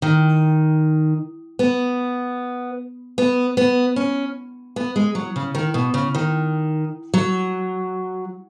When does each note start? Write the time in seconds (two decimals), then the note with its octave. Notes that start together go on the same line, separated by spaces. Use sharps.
0.02 D#3
1.59 B3
3.18 B3
3.57 B3
3.96 C#4
4.76 B3
4.96 G#3
5.15 F#3
5.36 C#3
5.55 D#3
5.74 B2
5.94 C#3
6.15 D#3
7.14 F#3